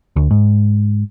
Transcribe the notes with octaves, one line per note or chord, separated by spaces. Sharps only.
D2
G#2